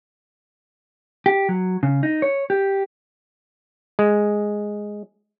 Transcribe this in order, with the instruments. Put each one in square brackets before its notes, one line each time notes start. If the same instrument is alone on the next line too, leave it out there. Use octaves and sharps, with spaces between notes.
[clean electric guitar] G4
F#3
C#3
D#4
C#5
G4
[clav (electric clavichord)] G#3